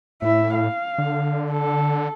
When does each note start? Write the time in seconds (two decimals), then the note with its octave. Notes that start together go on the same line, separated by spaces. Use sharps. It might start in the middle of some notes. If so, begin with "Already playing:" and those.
0.22 A2 E4 E5
0.55 F5
0.98 D3
1.52 A4